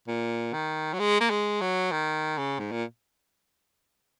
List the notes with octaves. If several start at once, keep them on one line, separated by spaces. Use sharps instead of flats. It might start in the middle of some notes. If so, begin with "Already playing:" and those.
A#2
D#3
F#3
G#3
A#3
G#3
F#3
D#3
C#3
G#2
A#2